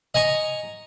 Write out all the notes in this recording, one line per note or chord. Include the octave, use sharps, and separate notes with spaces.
D#5 G#5 A#5 C#6